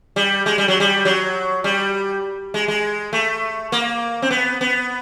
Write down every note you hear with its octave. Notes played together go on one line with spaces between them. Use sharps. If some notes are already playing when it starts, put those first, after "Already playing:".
G3
G#3
G3
F#3
G3
F#3
G3
G#3
G#3
A3
A#3
C4
B3
B3